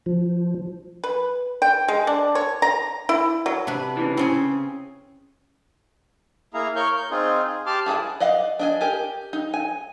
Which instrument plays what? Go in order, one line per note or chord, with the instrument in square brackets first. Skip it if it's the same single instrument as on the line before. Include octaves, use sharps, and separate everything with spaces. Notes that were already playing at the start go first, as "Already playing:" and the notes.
[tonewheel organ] F3
[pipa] B4
G5
G#3
D4
C#5
A#5
E4
F#3
[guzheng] C3 D4 B4
[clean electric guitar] C#3 E3
[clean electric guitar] C#3 [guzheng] C4 C#4 G#4
[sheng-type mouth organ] A#3 E4 G#4 F5 A#5
A#4 C#5 C#6 F6 G6
G6
C4 D#4 F4 G#4
G#4
G4 A5 C6 D6 F6
[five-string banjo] E4 G#4 F#5 A5
D5 D#5 F5 F#5
D4 D#5 G#5
G4 A#4 G#5
D#4
G#5